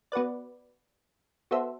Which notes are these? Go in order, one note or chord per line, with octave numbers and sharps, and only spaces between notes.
B3 F#4 B4 D5
B3 F#4 A4 C5 E5